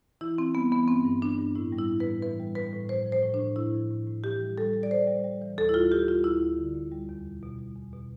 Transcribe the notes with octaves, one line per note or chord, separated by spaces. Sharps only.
E3 E4
E3 C4
G3 B3
E3 B3
G2 C4
G2
G2 D4
G2
A2 E4
G3
E4
E3
B4
A2
E3 B4
G3
G3 B4
A2
F3 C5
F3
C5
A2
D4
A2
A2 E4
F3
A2
A2
E3 G4
G3
G3 A4
G3
D5
G3 C5
G3
G3
E3
D2 A4
E4
G3 F4
G3 G4
G3 F4
D2 E4
D2
D3
D2
G3
E2
B2
B2
G3
E2
B2